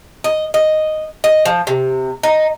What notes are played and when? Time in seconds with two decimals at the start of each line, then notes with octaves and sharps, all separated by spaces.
0.24 D#5
0.54 D#5
1.24 D#5
1.45 F3
1.67 C3
2.23 D#4